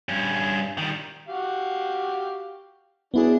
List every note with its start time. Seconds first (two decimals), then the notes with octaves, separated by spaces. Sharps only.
0.09 G2 C#4
0.78 D#3 G3
1.28 F#4 G4 F5
3.14 F#3 B3 D4 E4 G#4